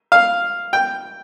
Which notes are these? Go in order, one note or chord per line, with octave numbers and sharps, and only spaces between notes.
F5
G5